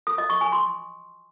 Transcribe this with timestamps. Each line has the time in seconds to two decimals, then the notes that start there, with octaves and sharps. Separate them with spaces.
0.07 D#6
0.18 D#5
0.30 C#6
0.41 G#5
0.52 C6